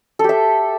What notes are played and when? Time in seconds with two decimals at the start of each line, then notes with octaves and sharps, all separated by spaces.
0.19 A4
0.24 G4
0.29 E5